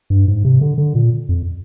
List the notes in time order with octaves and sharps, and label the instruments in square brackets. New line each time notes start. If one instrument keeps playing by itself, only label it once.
[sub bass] G2
G#2
C3
D3
D3
A#2
F2